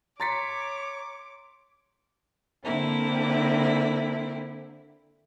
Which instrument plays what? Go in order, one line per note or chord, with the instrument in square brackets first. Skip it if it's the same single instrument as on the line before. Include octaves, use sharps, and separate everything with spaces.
[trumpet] C#5 [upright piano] A#5 A6 B6 [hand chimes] C6 C#7 [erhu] D6
[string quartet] D3 A#3 C4 E4